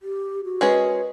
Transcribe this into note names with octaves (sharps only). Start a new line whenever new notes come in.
G4
F#4
G#3 C#4 G#4 A#4 B4 D#5